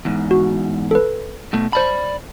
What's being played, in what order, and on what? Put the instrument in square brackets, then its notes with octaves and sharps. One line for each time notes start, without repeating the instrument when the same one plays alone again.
[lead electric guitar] E2 G#2
[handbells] F#4
A4 B4
[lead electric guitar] B2 A3
[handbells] C5 A5 [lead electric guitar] D5 B5